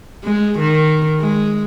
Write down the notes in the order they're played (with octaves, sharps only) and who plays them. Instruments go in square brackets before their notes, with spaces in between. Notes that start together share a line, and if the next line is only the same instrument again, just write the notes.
[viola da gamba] G#3
D#3
G#3